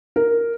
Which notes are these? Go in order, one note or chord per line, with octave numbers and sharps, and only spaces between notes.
A#4